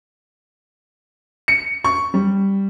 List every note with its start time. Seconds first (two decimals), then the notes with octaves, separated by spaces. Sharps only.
1.48 C#7
1.84 C#6
2.14 G3